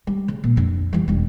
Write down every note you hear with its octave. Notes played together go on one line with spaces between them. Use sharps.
G3
C#3
A#2
F2 D3
E3 G3
E1 G3